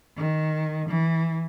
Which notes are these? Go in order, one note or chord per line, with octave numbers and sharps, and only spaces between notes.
D#3
E3